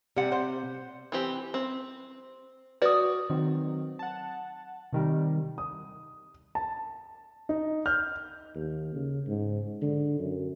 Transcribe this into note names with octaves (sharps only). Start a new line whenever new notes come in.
C3 G3 F#5
C5
E3 C4 G4
C4
F#4 B4 D5 D#6
D#3 F#3 C4
F#5 A5
C3 D#3 G3
D#6
A5
D#4
F6 G6
D#2
C#3
G#2
D3
F#2